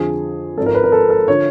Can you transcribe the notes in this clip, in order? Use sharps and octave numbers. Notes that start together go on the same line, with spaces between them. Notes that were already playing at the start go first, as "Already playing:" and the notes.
Already playing: F2 D3 F3 G#4
G#1 G#2 F3 A4
A#4
B4
A#4
A4
A4
D3 F3 C#5